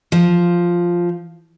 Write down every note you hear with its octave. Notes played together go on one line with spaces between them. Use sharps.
F3